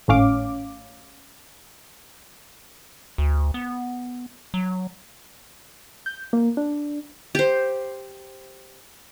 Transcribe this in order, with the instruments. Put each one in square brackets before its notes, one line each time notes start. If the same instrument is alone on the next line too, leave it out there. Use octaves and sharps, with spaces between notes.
[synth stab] G#1 A2 C#4 F5 D6
[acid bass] D2
B3
F#3
[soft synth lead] G6
A#3
D4
[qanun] G4 C5